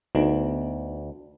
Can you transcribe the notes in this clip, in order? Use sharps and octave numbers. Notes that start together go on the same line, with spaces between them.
D2 B3 D#4